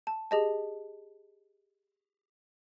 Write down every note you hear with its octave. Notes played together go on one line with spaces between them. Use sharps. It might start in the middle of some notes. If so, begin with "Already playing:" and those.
A5
G4 G#4 D#5 A5